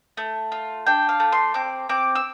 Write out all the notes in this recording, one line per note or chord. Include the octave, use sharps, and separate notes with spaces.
A3
F4
D4 G5
F5
A3
C6
C4 D6
C4 D6
E6